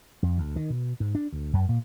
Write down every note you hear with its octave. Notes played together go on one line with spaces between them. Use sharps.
F2
D2
D#3
B2
G#2
D4
D2
F#2
A#2